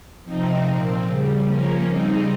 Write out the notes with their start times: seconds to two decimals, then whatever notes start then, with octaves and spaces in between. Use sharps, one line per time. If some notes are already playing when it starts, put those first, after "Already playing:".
0.24 C3 F3 C4 D#4
0.64 A#2 F3 C4
1.05 C#3
1.10 G3
1.45 C#3 F3 A#3 C#4
1.86 C#3 G3 C4 D#4